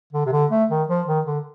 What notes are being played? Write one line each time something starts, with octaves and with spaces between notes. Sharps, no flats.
D3
C3
D3
A3
D#3
F3
D#3
D3